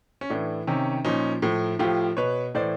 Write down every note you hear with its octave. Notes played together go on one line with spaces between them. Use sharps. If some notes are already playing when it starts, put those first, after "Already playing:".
C#4
A2 E3 D4
C3 D#3 C#4
A#2 F3 C#4 D#4
A2 F3
A2 F3 F4 G4
B2 B4 C#5
A2 E3 C5 D5